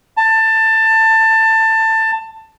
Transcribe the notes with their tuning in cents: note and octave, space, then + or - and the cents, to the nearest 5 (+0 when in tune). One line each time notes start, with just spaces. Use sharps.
A5 +20